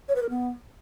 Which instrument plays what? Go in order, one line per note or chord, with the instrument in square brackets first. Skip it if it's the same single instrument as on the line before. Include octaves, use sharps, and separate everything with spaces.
[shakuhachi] C#5
B4
A#4
B3